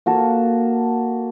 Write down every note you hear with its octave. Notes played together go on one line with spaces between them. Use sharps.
A#3 F#4 A4